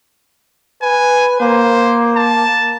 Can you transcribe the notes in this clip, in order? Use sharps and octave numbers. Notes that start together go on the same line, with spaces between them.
B4 G#5
A#3 C5
A5